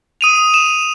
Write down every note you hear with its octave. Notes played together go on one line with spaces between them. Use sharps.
D#6 D#7 F7
E7